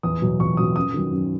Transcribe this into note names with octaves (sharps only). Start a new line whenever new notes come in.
E2 D#6
B2 F#3
E2 C#6
B2 F#3 D#6
F#2 D#6
D#3 F#3
F#2